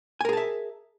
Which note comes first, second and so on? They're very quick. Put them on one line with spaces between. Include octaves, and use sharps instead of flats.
G#5 A#4 G#4 A5 E5